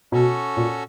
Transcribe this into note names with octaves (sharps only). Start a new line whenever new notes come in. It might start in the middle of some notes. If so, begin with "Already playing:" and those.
B2 C#4 F#4 A4
A#2